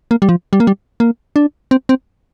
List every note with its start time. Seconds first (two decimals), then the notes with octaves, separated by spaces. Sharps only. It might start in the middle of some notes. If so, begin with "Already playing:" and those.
0.11 A#3
0.22 G3
0.29 F3
0.53 G3
0.60 A#3
0.67 G3
1.00 A#3
1.36 D4
1.71 C4
1.89 C4